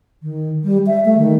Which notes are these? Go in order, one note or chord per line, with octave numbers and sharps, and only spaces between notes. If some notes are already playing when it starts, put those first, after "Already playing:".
D#3
G3
E5
A3
D#3